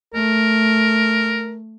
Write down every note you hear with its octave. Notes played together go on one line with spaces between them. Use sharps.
A3 A#4